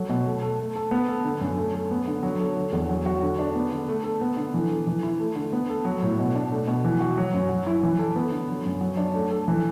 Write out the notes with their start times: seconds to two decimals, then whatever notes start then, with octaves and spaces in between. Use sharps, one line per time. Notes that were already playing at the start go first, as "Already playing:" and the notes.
Already playing: F#3 A4
0.10 B2
0.25 A3
0.42 A4
0.59 A3
0.76 A4
0.91 B3
1.08 A4
1.25 D3
1.41 F#2
1.57 A3
1.75 A4
1.91 B3
2.08 D3
2.23 F#3
2.40 A4
2.57 D3
2.72 E2
2.89 F#3
3.06 F#4
3.22 D3
3.39 D4
3.55 B3
3.72 D3
3.89 A3
4.04 A4
4.21 B3
4.37 D3
4.54 E3
4.71 A4
4.87 E3
5.03 E4
5.20 A3
5.36 D3
5.53 B3
5.69 A4
5.85 F#3
6.02 A2
6.19 B2
6.35 D4
6.52 A3
6.67 B2
6.85 E3
7.00 F#4
7.18 F#3
7.34 F#2
7.49 F#3
7.66 E4
7.83 E3
7.99 A4
8.16 B3
8.31 D3
8.48 F#3
8.66 F#2
8.81 F#3
8.97 D4
9.14 A3
9.31 A4
9.48 E3